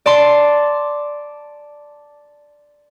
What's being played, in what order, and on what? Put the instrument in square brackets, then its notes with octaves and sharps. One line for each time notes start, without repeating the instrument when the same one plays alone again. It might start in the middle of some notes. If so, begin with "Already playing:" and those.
[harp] D5 A5 C6